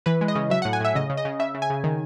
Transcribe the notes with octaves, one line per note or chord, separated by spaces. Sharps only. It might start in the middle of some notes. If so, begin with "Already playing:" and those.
E3 B4
G#3
D#5
C#3
F#3 E5
F#5
A2
G#5
A2 E5
C#3 D#5
C#3
D#5
C#3
C#3 E5
C#3
G#5
C#3
D#3